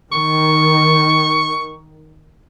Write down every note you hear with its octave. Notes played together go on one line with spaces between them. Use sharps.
D#3 C#6